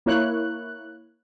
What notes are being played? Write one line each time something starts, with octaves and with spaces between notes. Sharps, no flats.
A#3 E4 C#5 F#6